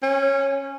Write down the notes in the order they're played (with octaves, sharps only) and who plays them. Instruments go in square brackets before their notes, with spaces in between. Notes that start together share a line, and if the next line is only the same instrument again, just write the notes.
[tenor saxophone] C#4